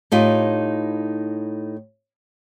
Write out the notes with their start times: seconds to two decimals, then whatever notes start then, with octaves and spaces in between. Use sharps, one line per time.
0.11 A2 D#4 F4 G4